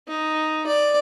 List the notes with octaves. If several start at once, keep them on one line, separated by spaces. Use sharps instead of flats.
D#4
D5